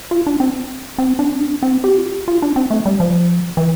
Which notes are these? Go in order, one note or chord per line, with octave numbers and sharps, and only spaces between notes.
F4
D4
C4
C4
D4
C4
D4
C4
G4
F4
G4
F4
D4
C4
A3
G3
F3
E3